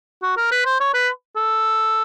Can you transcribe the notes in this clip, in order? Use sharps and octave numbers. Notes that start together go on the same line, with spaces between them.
F#4
A#4
B4
C5
C#5
B4
A4